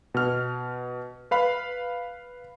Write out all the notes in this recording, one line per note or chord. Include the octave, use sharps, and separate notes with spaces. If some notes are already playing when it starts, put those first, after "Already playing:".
B2 F6
B4 F5 B5